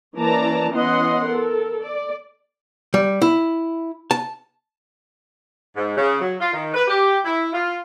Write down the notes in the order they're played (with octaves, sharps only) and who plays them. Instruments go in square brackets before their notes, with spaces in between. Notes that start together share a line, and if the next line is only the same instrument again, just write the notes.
[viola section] E3 A#3 C#4 D5 A5 A#5
E3 B3 C#4 D#5 F#5 C6
A4 A#4
D5
[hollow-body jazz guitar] G3
E4
A5
[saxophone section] G#2
C#3
F#3
F4
D#3
B4
G4
E4
F4